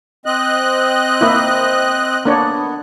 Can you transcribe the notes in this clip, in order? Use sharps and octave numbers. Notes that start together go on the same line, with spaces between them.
C4 D#5 F#6
A#3 E4
A#3 B3 D4 C#5